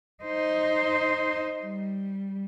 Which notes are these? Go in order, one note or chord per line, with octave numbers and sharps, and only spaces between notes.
D#4 C5
G3